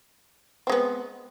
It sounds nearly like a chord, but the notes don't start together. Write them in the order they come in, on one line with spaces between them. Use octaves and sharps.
C4 G#3 B3